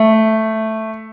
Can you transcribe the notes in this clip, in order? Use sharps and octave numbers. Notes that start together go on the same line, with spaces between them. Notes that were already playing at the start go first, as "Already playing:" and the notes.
Already playing: A3